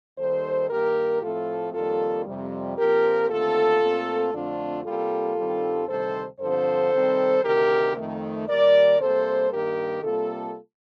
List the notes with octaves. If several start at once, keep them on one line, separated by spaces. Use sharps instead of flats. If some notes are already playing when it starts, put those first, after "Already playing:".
D#2 D#3 G3 A4 C5
G2 D#3 A#3 G4 A#4
A2 F3 A3 C4 F4 A4
F2 D#3 G3 A#3 F4 A4
F2 C3 G3
A#2 F3 C4 G4 A#4
D#2 D3 A3 C4 F4 A4
A#2 A3 C4
F2 D3 A3 C4 D4 F4
C3 G3 A#3 F4 A4
G2 D#3 G3 C4
D2 C3 D#3 G3 A4 C5
G2 D3 F3 C4 A4 C5
C3 D#3 G3 C4
D2 C3 D#3 G4 A#4
F2 D#3 A3
D#2 D#3 G3 A#4 D5
C3 G3 A#3 A4 C5
G2 D#3 A#3 G4 A#4
C3 G3 A#3 F4 A4